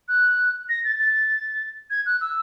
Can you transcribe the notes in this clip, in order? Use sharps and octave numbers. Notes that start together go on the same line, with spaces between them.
F#6
A#6
A6
A6
G#6
F#6
E6